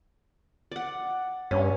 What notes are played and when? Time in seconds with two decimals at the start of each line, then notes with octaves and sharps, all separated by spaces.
0.72 D5 F#5
1.51 G2 C#4